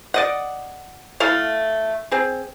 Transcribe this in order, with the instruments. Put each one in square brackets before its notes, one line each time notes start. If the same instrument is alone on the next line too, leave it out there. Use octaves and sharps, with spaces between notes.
[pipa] D5 D#5 F#5
A3 E4 A4 F5
C4 G#4